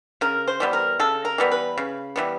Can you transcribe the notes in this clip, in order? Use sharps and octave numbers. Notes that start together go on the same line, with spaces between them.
C#3 A#4
C5
E3 G3 B3
A#4
C#3 A4
A#4
E3 G3 B3
B4
C#3
E3 G3 B3